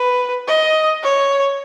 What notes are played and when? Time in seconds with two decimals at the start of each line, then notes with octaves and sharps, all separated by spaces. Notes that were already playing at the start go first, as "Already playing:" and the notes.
Already playing: B4
0.47 D#5
1.03 C#5